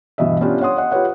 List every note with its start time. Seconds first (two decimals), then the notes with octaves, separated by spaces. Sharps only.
0.18 G2 B2 E3 D#5 E5
0.41 B3 C#4 D4 F4 G4 C#5
0.61 C#5 F#5 C6 D#6
0.77 D#5 F#5
0.92 F4 G4 B4 C#5 F#5